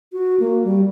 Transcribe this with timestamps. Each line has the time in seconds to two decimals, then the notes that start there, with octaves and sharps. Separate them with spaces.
0.13 F#4
0.40 A#3
0.64 G3